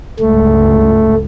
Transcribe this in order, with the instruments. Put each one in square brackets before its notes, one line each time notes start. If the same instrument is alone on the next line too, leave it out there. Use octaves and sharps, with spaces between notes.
[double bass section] G1 C#2 G#2 [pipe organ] A3